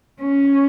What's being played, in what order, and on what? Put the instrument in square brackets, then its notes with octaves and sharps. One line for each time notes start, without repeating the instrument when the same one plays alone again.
[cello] C#4